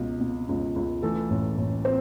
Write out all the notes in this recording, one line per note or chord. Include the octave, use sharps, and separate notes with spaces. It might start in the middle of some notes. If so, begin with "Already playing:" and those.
Already playing: C#2 B2
B2
C#2
C#2
E3 A3 A4
A1
A1
C4 C5